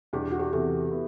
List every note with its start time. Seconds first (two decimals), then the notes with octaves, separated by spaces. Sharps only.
0.13 E2 B2 G3 D4 G4
0.32 F#4
0.39 G4
0.53 E2 C3 E3 A4
0.91 B3 E4